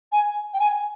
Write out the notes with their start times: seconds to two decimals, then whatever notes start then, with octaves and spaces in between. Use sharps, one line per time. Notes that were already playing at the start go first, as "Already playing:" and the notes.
0.12 G#5
0.53 G5
0.59 G#5